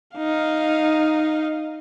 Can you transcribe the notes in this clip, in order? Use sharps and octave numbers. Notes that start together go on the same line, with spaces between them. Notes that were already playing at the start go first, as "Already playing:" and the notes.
D#4 F5